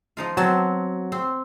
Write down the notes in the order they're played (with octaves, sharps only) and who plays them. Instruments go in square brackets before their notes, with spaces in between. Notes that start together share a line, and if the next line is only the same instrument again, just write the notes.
[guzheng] F3 D#4 F4
[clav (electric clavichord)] F#3 [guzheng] B3 C4 A5
[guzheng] C4